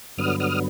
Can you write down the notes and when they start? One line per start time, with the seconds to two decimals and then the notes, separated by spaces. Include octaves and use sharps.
0.18 G2 D3 F#3 B3 D#6 F6
0.40 D#6 F6